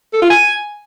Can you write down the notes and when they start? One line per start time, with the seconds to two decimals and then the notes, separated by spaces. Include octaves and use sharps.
0.13 A4
0.22 F4
0.30 G#5